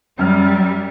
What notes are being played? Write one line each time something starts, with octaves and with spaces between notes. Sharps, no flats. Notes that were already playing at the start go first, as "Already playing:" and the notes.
F#2 G3 F6